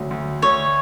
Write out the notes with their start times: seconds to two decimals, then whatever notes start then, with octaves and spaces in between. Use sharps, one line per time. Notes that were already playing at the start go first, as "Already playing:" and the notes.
Already playing: D2 C#3 F#3
0.11 D2
0.42 D2 C#5